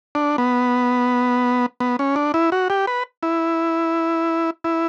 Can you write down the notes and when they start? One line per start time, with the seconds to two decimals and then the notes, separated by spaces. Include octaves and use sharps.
0.15 D4
0.38 B3
1.80 B3
1.99 C#4
2.16 D4
2.34 E4
2.52 F#4
2.70 G4
2.87 B4
3.23 E4
4.64 E4